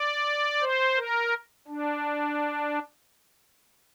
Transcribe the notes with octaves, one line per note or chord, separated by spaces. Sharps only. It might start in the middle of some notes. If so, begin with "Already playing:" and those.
Already playing: D5
C5
A#4
D4